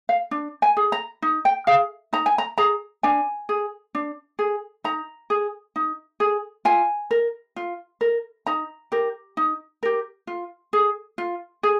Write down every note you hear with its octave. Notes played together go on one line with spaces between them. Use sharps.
F5
D4
G#5
G#4
A#5
D#4
G5
G#4 F5
D#4 A#5
G#5
A#5
G#4 A#5
D4 G#5
G#4
D4
G#4
D#4 A#5
G#4
D#4
G#4
F4 G#5
A#4
F4
A#4
D#4 A#5
G4 A#4
D#4
G4 A#4
F4
G#4
F4
G#4